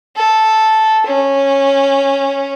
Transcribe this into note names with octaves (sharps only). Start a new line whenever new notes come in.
A4
C#4